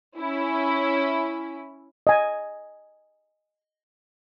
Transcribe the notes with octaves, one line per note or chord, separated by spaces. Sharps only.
C#4 E4
D#5 G#5